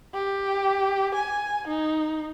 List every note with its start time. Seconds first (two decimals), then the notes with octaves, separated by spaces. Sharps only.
0.15 G4
1.15 G#5
1.68 D#4